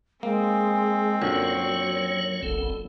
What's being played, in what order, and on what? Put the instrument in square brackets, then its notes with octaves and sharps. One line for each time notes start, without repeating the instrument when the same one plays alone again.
[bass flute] G#3 [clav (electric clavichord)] A#3 [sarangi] C4
[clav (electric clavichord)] F#2 A#2 D3 [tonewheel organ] F#3 C#5 [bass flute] F#4
[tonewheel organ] F#1 B1 C4 [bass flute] A4